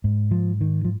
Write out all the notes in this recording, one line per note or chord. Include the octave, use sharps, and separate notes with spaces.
G#2
F3
D#3
F3